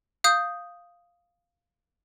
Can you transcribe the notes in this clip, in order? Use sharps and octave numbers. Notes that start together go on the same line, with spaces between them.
F5 D#6 G6